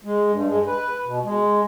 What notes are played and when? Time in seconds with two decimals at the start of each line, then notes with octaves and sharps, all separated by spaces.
0.04 G#3
0.31 G2
0.47 G#3
0.67 B4
1.05 B2
1.24 G#3